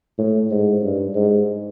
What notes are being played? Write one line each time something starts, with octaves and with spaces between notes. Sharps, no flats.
A2
G#2
G2
G#2